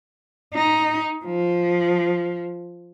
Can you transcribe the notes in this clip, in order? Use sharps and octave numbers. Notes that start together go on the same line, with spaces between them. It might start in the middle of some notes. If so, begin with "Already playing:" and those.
D#4
F3